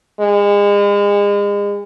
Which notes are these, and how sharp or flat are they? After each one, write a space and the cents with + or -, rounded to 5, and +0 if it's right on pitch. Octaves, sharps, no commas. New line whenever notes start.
G#3 -35